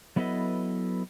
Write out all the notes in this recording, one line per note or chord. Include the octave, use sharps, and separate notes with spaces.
F#3 B3 E4 A4 B4 D#5